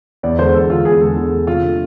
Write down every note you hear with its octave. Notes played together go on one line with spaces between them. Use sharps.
E2 D5
D3 G#3 C5
E2 A4
D3 G#3 F4
E2 G#4
D3 G#3 A4
E2
D3 G#3
C3 F4
F3 A3 D4